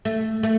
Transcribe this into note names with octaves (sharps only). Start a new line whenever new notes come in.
A3
A3